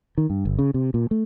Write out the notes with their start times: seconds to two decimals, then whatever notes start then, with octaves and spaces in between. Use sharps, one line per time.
0.18 D#3
0.30 G2
0.45 G1
0.59 C#3
0.74 C3
0.94 A#2
1.11 A3